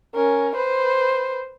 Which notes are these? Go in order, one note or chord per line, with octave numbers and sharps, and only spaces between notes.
C#4 A#4
B4 C5